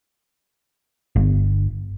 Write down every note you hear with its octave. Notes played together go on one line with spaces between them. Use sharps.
G1